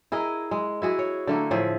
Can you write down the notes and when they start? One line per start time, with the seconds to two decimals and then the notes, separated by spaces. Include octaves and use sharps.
0.12 E4 G#4 A#4 D#5
0.51 G#3
0.82 E4 F#4 G#4
0.99 C#5
1.27 D3 A3 A#3
1.51 A2 F3 G#4 E5